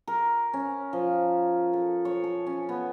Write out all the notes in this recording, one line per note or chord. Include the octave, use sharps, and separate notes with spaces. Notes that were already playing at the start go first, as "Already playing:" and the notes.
A#4
C#4
F3
A4
C#5
A4
C#4
B3